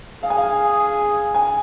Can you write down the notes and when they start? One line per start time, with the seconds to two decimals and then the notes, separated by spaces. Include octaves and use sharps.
0.23 G#4 F5
0.30 G#5
0.37 F5
1.35 G#5